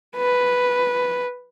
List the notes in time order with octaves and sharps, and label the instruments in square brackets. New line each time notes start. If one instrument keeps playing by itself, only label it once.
[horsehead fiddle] B4